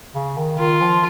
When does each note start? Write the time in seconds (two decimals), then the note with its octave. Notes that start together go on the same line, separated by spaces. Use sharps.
0.15 C#3
0.37 D#3
0.59 D#3 F4
0.81 F3